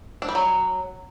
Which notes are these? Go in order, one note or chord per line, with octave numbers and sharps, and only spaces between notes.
D4
G3
F#3